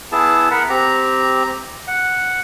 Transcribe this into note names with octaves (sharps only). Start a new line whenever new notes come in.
B3 E4 G#4 A5
A#4 F#5 B5
C4 G4 A#5
F#5